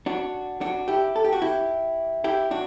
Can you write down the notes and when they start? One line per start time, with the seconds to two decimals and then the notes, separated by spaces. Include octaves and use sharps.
0.06 D4 F#4
0.61 D4 F#4
0.88 E4 G4
1.16 A4
1.24 G4
1.32 F#4
1.42 E4 G4
2.24 E4 G4
2.51 D4 F#4